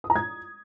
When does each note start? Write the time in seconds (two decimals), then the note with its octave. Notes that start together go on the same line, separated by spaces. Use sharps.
0.04 D#6
0.10 A#5
0.16 G#6